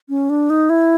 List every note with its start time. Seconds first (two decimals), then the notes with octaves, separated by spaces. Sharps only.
0.09 C#4
0.30 D4
0.50 D#4
0.70 E4